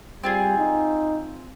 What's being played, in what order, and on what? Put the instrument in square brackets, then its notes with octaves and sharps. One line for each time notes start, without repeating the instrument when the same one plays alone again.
[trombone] G3 [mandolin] C4 F4 G#4
[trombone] D#4